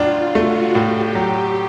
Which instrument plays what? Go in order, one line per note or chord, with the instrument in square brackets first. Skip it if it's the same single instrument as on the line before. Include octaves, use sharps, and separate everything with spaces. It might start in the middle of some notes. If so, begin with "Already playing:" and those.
Already playing: [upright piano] A2 F#3 D4 [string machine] F4
[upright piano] A3 [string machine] F#4
[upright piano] A2 [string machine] G4
[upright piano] F#3 [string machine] G4